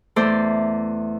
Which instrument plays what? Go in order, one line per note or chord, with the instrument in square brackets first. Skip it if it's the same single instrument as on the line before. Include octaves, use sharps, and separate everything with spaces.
[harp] E2 A3 A4 C5 D5 E5